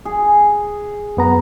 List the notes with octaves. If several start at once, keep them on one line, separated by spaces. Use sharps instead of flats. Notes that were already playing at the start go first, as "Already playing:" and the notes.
G#4
F#2 B3 A#5